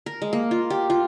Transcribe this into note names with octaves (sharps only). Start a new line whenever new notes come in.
A#4
G#3
A#3
F4
G4
F4